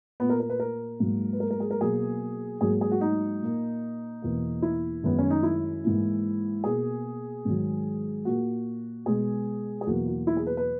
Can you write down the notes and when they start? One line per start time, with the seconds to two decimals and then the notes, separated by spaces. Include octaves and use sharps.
0.20 A#2 A#3 B3
0.30 A#4
0.40 A#4
0.50 B4
0.60 A#4
1.00 G#2 F#3 A#3
1.33 B4
1.40 A#4
1.51 A#4
1.60 G#4
1.71 A#4
1.81 B2 F#3 A#3 G#4
2.61 G#2 F#3 A#3 G#4
2.81 G#4
2.91 F#4
3.01 D#4
3.41 A#2 A#3
4.22 E2 B2 A#3
4.62 E4
5.03 F#2 D#3 G#3 B3
5.19 C#4
5.30 D#4
5.43 E4
5.84 G#2 E3 A#3
6.64 B2 A#3 G#4
7.45 G#2 D#3 F#3
8.25 A#2 A#3 F#4
9.06 B2 G#3 G#4
9.81 G#4
9.87 E2 B2 F#3 A#3 F#4
10.07 F#4
10.27 E4
10.37 G#4
10.47 B4
10.57 B4